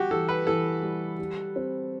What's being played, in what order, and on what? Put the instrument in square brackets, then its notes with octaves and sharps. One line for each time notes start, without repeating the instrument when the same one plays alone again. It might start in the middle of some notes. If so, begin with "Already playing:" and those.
Already playing: [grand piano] G3 [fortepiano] F#4 G4
[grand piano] E3 [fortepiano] A4
[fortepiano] B4
[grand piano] E3 [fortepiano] A4
[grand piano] G3
G3
C4